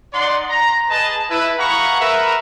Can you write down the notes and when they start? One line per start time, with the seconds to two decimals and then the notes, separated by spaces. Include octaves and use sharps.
0.13 D#4 D5 F#5 C6
0.49 A#5
0.89 G#4 B4 D#5 A5
1.30 E4 B4
1.58 G#4 F5 F#5 A#5 B5 C#6
2.00 A#4 B4 E5